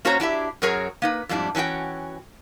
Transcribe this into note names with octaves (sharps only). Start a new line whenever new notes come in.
A#3 C#4 F#4 C5 C#5 A#5
D4 E4 G4 E5
F#2 F#3 G#4 A#4 C#5 A#5
A#3 D#4 B4
F2 G#2 G3 D4 E4
E3 C#4 D4 F#4 G5